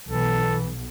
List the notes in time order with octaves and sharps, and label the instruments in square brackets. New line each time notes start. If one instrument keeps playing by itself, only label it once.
[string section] B1 [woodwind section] E3 [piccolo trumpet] A4